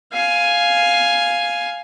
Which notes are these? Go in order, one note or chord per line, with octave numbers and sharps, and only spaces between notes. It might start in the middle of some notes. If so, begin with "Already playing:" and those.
F5 G#5